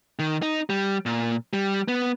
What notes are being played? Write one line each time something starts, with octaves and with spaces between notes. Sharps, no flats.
D#3
D#4
G3
A#2
G3
B3